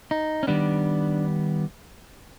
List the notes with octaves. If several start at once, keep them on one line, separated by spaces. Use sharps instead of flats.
D#4
C#4
D#3 G3 B3 D4